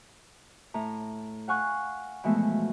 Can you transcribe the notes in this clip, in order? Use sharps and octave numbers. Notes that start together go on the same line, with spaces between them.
A2 A#5
F5 F#5 G#5 C#6 F#6
B2 E3 F3 G#3 A3 B3